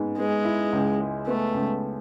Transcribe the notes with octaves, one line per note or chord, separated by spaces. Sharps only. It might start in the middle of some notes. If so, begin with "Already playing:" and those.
Already playing: G#2 B3
G#3 B3
E4
C#2
G#3
A3 B3
C#2